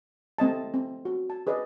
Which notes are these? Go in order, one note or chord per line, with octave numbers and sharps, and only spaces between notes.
A3 C4 D#5 A5
C4
F#4
A5
G#4 B4 D5 D#5